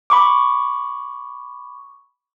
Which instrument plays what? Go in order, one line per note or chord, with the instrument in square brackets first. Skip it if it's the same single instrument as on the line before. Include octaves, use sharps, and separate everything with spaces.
[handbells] B5 C#6 D6